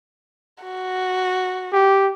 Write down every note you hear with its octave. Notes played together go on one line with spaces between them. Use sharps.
F#4
G4